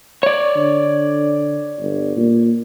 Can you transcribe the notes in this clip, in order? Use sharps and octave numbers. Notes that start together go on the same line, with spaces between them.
C#5 D5
D3
G1
A#2